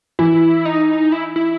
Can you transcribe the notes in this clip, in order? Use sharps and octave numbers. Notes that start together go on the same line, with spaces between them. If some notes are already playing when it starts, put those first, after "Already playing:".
E3 E4
D#4
E4
E4